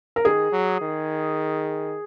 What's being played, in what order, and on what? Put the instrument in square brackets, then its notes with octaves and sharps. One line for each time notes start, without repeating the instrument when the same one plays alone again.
[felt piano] A#4
[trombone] D#3 [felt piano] G#4
[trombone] F#3
D#3